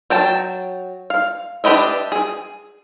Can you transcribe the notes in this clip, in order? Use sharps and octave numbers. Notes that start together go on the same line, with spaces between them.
F#3 G5 A5
F5
D4 G4 B4 D#5 E5
G#4